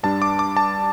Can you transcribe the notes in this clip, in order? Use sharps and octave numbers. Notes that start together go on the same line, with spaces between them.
G2 G3 D4 A5
D6
D6
A5